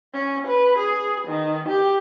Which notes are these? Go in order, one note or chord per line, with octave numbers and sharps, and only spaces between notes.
C#4
B4
G#4
D#3
G4